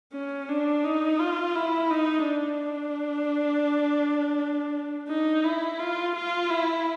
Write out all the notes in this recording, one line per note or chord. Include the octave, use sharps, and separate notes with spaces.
C#4
D4
D#4
F4
E4
D#4
D4
D#4
E4
F4
F4
E4